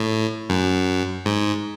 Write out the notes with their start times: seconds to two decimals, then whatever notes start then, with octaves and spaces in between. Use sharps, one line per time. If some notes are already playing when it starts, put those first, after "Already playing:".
Already playing: A2
0.49 F#2
1.25 G#2